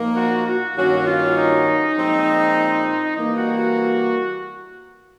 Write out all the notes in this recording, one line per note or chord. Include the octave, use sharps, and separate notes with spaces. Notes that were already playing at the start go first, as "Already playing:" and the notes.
Already playing: A#2 F3 A#3 D#4
F#4
F#4
G2 D#3 F#3 A#3 C#4 F#4
F4
D#4
A#2 F3 G#3 C4
E3 G3 A#3 D#4
F#4
F#4